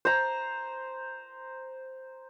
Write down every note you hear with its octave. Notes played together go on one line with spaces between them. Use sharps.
C5 A#5